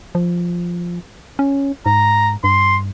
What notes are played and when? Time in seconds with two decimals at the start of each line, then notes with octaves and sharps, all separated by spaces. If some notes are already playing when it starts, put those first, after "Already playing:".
0.15 F3
1.39 C#4
1.86 G#2 A#5
2.44 G2 C6